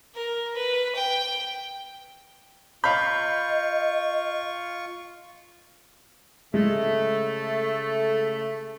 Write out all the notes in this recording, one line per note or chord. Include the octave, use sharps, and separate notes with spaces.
A#4
B4
G5
F4 D#5 F5 B5 C#6 G6
C#3 G#3 A3